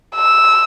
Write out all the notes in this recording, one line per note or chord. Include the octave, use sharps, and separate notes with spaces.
E6